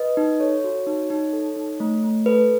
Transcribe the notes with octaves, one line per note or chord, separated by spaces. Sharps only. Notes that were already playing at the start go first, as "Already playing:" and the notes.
Already playing: B4 D#5
D#4
A4 C#5
F#4
D#4
D#4
A4
D#4
A3
A3
A4 B4